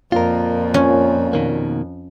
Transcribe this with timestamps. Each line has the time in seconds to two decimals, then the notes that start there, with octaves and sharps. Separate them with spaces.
0.12 F2 A#2 F4 A#4
0.74 C#4
1.33 B2 D#3 A#3